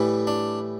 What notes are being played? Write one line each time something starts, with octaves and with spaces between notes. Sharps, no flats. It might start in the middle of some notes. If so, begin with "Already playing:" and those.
Already playing: A2 E3 G3
D4